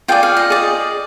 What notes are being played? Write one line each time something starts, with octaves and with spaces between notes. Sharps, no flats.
F4 G#4 D5 G5
F5
D#5
G#4 D5